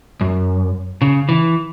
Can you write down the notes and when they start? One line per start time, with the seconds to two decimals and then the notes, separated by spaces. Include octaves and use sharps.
0.21 F#2
1.02 C#3
1.29 E3